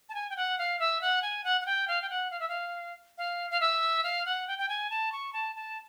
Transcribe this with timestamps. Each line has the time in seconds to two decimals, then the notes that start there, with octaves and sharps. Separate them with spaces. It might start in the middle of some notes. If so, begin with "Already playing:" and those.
0.09 A5
0.14 G#5
0.30 G5
0.36 F#5
0.58 F5
0.79 E5
1.01 F#5
1.22 G#5
1.44 F#5
1.61 F#5
1.66 G5
1.88 F5
2.02 G5
2.10 F#5
2.31 F5
2.40 E5
2.49 F5
3.18 F5
3.51 F5
3.61 E5
4.04 F5
4.26 F#5
4.47 G5
4.58 G5
4.69 G#5
4.90 A5
5.12 C#6
5.33 A5
5.56 A5